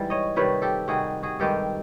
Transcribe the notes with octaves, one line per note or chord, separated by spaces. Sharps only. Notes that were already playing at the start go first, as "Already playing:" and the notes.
Already playing: G#2 E3 G3
C#5 D#5
C3 D#3 G3 B4 C#5
G4 A4
C3 D#3 G3 F#4 G#4
F#4 G#4
G2 D#3 G#3 G4 A4